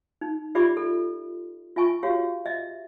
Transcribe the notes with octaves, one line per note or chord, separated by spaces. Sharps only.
D#4
F4 G4 D5 E5 B5 D6
A4
F4 E5 G#5 C#6
F#4 G4 C#5 F5
D#5 E5